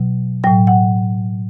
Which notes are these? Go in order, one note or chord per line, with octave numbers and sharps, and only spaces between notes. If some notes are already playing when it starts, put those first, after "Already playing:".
Already playing: B2 F#3
A2 F#3 G5
F#5